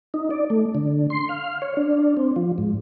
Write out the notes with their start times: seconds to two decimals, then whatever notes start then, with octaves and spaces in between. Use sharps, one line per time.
0.14 D#4
0.30 D5
0.50 A3
0.75 D3
1.10 C6
1.29 F5
1.62 C#5
1.77 D4
2.17 C4
2.36 F3
2.58 G#2